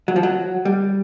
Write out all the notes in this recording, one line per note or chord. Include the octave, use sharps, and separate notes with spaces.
F#3
F3
F#3
G3